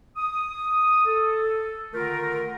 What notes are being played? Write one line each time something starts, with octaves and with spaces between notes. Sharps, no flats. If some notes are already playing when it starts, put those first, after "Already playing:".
D#6
A4
D3 D#3 A3 F4 A#4